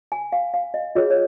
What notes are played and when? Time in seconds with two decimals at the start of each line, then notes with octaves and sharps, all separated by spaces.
0.12 G#5
0.32 F5
0.54 F5
0.74 D#5
0.95 F4 G#4 C#5 D#5
1.10 C#5